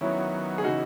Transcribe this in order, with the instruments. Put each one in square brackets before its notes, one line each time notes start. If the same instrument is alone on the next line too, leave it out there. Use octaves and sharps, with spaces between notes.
[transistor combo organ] D#3 F#3 B3 [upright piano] C#4 E4
[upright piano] G#4
[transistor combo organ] C#3 E3 [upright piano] D#4 F#4